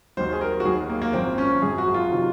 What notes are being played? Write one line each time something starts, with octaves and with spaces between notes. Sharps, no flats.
D#2 D#3 F#3 C5
G#4
A#4
F#4
D#2 D#3 F#3 G#4
A#3
A#3
G#1 F#2 F3 C4
C#4
G#1 F#2 F3 G#4
F#4
F4
C3 D#3 F#3